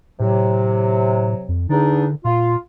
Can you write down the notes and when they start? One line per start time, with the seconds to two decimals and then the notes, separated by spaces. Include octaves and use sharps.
0.20 A2 C3 F#3
1.49 F2
1.69 E2 D3 D4 D#4
2.25 A#2 F4